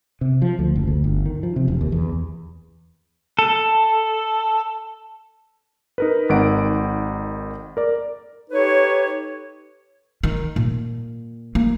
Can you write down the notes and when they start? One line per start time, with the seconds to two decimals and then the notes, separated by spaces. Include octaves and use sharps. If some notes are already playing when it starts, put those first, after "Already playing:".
0.21 C3
0.42 F3
0.59 D2
0.76 F#1
0.87 D2
1.04 G1
1.26 D#3
1.43 F3
1.56 C3
1.68 E1
1.81 D#2
1.92 E2
3.39 A4
5.98 D#4 A#4 B4
6.29 G#1 D#3 F#5 D7
7.77 A#4 D5
8.51 D#4 G4 A4 B4 C#5
10.23 D#3
10.56 A#2
11.55 A#3